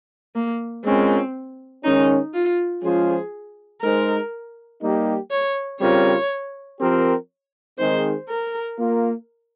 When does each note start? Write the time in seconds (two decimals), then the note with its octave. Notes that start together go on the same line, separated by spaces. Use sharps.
0.35 A#3
0.84 G#3 C4 C#4 F4 A#4
1.84 D#3 G#3 C#4 D#4
2.34 F4
2.83 F3 G#3 C#4 F4 G#4 C5
3.82 G#3 D#4 G#4 A#4 C5
4.82 G3 A#3 D#4 G4
5.31 C#5
5.80 C#3 G3 C4 F4 A#4 C#5
6.80 F3 C4 G4 A#4
7.79 D#3 G#3 C4 D#4 G#4 C5
8.29 A#4
8.78 A#3 F4 A#4